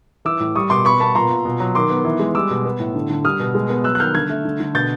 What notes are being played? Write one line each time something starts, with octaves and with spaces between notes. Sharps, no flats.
E3 D6 E6
A2
G3 C#6 D#6
B2 C6 D6
B3 B5 C#6
B3 A5 B5
A#2 A#5 C6
A#2
B2
F#3
D#3 C6 D6
B3
E3
G#3
G3 D6 E6
B2
B3
A2
D3
D3
G3 D#6 F6
B2
G#3
B3
F#3 E6 F#6
F#6
D#3 F6 G6
D3 F#6 G#6
A3
D3
D3
B2 G6 A6